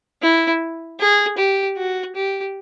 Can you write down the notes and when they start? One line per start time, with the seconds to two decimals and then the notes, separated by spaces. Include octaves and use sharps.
0.22 E4
1.00 G#4
1.38 G4
1.77 F#4
2.15 G4